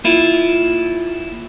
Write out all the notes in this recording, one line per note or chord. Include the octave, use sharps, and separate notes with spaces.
A#3 E4 F4